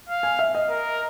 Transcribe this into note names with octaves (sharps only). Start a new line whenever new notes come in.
F5
G#5
E5
D#5
A#4